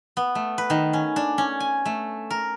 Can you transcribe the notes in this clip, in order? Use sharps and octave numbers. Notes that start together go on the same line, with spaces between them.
B3
A3
B4
D#3
C#4
D4
C#4
G#5
A3
A#4